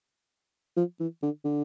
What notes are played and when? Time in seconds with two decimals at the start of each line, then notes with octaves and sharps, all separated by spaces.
0.77 F3
1.00 E3
1.23 D3
1.45 D3